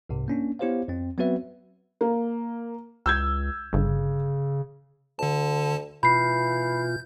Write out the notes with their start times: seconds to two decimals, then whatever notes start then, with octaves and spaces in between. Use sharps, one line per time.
0.09 C2 G#2 C3
0.28 A#3 C#4 D4
0.59 B3 E4 G4 C5 C#5 F5
0.88 F2 C4
1.18 F#3 B3 C4 F#4 B4 E5
2.01 A#3
3.06 C#2 E6 G6 G#6
3.73 G1 C#3
5.19 D2 D3 A5
6.03 B2 E3 F4 B5 G6 C7